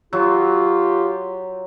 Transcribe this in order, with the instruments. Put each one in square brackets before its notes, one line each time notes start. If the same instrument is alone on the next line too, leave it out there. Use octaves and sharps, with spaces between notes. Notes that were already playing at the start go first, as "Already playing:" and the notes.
[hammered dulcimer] F#3 [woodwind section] F4 G4